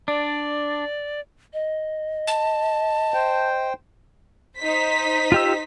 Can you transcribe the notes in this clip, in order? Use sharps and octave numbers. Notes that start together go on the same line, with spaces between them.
D4 D5
D#5
A5
C5 G5
D#4 C5 B6
F4 G4 E6